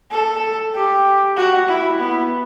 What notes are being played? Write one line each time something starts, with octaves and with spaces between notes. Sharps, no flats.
A4
G4
F#4
E4
B3